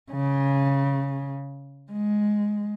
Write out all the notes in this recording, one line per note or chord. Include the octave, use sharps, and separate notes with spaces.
C#3
G#3